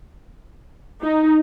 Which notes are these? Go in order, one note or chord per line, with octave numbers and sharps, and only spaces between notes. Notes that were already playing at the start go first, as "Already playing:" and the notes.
D#4